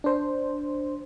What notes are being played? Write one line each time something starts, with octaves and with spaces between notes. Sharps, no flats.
D4 C5